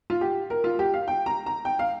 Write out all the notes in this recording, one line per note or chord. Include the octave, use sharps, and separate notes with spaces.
F4
G4
A#4
F4
G4
F5
G5
A#5
A#5
G5
F5